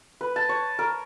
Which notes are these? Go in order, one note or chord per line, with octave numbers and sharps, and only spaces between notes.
B4
A5
C#5
A#4